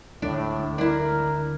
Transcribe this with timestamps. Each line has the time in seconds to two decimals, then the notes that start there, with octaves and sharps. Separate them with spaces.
0.22 D2 A2 D#3 G#3 D4
0.78 D4 E4 A#4